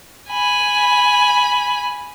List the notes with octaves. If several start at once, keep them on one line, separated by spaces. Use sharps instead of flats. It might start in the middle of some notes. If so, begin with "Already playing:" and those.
G#5 B5